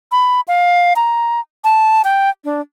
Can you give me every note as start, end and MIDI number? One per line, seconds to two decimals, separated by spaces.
0.12 0.41 83
0.48 0.93 77
0.96 1.40 82
1.64 2.02 81
2.04 2.30 79
2.44 2.61 62